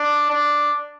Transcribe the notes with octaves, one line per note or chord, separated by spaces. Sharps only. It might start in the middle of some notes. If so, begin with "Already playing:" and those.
Already playing: D4
D4